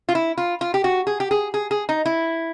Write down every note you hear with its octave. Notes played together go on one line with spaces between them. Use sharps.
F4
E4
F4
F4
G4
F#4
G#4
G4
G#4
G#4
G#4
D#4
E4